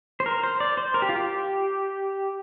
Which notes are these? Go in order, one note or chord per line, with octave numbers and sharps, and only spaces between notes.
C5
A#4
C5
D5
C5
A#4
G4
F4
G4